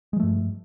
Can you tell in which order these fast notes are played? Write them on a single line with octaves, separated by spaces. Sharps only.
G#3 F3 A3 G2